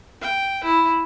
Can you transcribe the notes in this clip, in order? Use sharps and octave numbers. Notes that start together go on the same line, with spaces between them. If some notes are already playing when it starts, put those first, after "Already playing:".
G5
E4